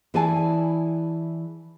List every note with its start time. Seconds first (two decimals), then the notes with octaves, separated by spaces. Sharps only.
0.14 E3 E4 G#4 D5 G#5 A5